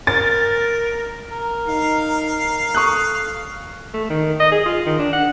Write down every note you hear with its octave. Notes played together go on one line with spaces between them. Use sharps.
A#4 A6
A#4
D#4 F5
A4 C#6 D#6 F#6
A3
D#3
D#5
G#4
F4
D#3
D4
F#5